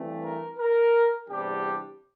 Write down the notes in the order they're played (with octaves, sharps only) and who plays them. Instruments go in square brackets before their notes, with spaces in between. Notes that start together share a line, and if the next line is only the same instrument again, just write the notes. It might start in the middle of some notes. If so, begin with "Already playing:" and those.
Already playing: [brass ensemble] G2 E3 A3 C4
A#4
A#4
E2 C3 G3 D4 G4